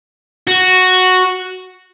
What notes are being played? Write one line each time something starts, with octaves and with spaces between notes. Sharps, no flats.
F#4